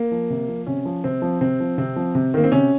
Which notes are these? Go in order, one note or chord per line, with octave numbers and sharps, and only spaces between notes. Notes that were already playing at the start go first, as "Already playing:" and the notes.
Already playing: A#3
F3
C3
F3
C3 C#4
F3
C3 C4
F3
C3 C4
F3
C3 C4
F3
C3
D#3 A#3
C4
C3 C#4